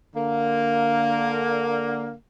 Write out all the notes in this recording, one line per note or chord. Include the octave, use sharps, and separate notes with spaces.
D3 A#3